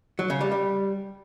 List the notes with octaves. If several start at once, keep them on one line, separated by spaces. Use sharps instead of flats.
F#3
C#3
G3
G3